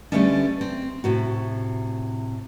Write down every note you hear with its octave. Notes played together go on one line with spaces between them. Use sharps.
D3 G3 A3 B3 C#4 D4
C4
A2 C3 F#4